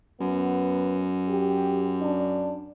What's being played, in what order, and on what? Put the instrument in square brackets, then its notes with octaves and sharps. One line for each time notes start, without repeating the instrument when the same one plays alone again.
[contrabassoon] F#2 [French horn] B3
[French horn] G4
D4